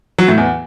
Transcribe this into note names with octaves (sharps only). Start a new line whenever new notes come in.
F#3
A2
E2